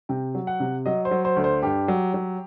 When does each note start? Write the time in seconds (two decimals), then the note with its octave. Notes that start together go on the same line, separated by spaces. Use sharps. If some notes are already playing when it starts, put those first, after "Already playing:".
0.09 C3 G5
0.35 F#3
0.47 F#5
0.60 C3
0.86 F#3 D#5
1.05 C5
1.11 F#3
1.25 C5
1.36 D2
1.44 C5
1.63 G2 G4
1.88 F#3
2.14 F#3